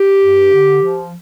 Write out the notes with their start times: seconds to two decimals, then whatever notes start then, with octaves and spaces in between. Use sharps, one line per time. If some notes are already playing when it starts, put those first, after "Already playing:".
Already playing: G4
0.21 G2
0.52 D3
0.82 F3